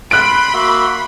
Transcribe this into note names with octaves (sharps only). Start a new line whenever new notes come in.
B5 C6 F#6 D7
A#3 F#4 E5